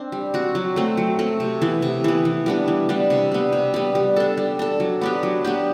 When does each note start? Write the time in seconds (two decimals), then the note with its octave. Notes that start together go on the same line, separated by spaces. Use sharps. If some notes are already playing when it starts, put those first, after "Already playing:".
Already playing: C4 D4
0.12 G3
0.34 C4 F#4
0.55 F#3
0.76 A3 C4
0.97 F#3
1.19 A3 C4
1.40 C3
1.62 E3 B3
1.82 C3
2.04 E3 B3
2.25 E3
2.46 G3 B3 D4
2.68 E3
2.89 G3 B3 D4
3.10 C3
3.32 G3 B3
3.53 C3
3.74 G3 B3
3.95 G3
4.16 D4 A4
4.38 G3
4.59 D4 A4
4.80 F#3
5.01 B3 D4 G4
5.23 F#3
5.45 B3 D4 G4